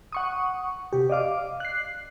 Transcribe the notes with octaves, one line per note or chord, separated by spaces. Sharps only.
F#5 C#6 D#6
C3 G4
D5 D#5 F5 D6
F#6 C7